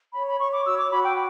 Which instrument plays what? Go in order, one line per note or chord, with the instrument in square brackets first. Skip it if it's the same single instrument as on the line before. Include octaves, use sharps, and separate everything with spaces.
[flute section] C#5 B5
B5
C#5 C#6
D6
F#4 E6
D6
F#4 B5
G5